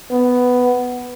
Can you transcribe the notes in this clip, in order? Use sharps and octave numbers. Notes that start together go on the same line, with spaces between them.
B3